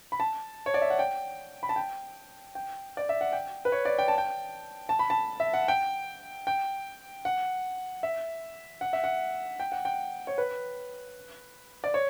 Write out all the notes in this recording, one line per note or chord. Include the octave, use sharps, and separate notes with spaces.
B5
A5
C#5
D5
E5
F#5
G5
B5
A5
G5
G5
D5
E5
F#5
G5
B4
C#5
D5
G5
A5
G5
A5
B5
A5
E5
F#5
G5
G5
F#5
E5
F#5
E5
F#5
G5
F#5
G5
C#5
B4
D5
C#5